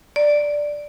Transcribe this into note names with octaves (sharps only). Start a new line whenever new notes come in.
D5